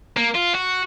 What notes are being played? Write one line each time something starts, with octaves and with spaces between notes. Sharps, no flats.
A#3
F4
F#4